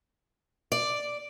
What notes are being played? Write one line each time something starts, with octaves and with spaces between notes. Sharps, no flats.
D5